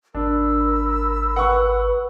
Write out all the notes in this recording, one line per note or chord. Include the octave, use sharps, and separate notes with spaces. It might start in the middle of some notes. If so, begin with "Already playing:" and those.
G#1 D4 A#4 B5 E6
B4 F#5 C#6